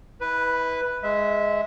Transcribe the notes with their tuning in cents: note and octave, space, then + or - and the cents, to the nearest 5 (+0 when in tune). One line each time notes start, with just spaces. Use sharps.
E4 -35 B4 +0
G#3 +0 E5 -15